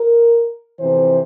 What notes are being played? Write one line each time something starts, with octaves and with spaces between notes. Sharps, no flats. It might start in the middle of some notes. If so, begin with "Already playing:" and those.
Already playing: A#4
F2 C3 E3 C5